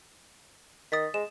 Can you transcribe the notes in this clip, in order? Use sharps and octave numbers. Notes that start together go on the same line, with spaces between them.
D#3 D#6 A6 B6
G#3 E7